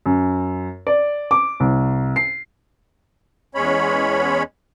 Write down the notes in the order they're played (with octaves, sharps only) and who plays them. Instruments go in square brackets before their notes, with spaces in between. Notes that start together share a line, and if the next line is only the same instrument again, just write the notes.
[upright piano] F#2
D5
D6
C2
C7
[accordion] E2 G#3 C#4 C#5 B5